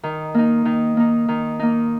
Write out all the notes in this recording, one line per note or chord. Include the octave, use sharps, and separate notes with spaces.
D#3
A#3 D#4
D#3
A#3 D#4
D#3
A#3 D#4